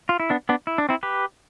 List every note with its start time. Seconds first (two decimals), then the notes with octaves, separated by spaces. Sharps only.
0.09 F4
0.20 E4
0.30 B3 D4
0.49 B3 D4
0.67 E4
0.78 D4
0.89 C4 E4
1.03 G4 B4